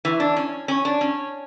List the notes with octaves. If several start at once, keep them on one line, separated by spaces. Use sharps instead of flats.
E3
D4
C#4
C#4
D4
C#4